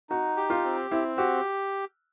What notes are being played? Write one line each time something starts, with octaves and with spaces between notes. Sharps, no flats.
D#4 F#4
G4
F4
C4
C4 E4
F#4 G4